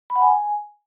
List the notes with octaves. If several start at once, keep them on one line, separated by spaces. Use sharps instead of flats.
B5
F#5
G#5